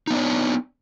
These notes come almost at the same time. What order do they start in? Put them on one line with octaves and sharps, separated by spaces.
D#4 B3 D4 C#5